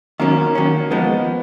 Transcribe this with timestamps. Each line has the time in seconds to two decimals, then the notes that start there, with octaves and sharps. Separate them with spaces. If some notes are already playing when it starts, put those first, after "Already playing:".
0.20 D#3 F#3 A#3 C#4
0.55 D#3 F#3 C#4
0.90 F3 G#3 B3